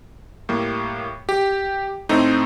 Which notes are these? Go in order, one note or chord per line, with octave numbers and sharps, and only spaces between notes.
A2 G3 A#3
G4
A2 A3 C4 D#4